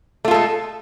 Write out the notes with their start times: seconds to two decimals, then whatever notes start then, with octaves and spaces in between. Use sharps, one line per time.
0.25 A3
0.28 F4
0.31 A4
0.34 G#3